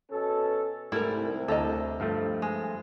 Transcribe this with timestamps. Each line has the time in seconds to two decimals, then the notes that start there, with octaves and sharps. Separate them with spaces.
0.10 B2 C#4 A4
0.92 C2 G#2 G3 A3 E4 A#4
1.48 D2 A4 D#5 A#5
2.00 G2 F3 A3
2.42 G#3